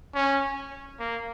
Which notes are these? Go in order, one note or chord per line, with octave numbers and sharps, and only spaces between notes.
C#4
A#3